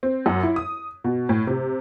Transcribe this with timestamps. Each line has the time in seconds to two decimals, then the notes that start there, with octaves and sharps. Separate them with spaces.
0.03 C4
0.26 F#2
0.43 E4
0.56 D#6
1.04 B2
1.29 A2
1.47 C3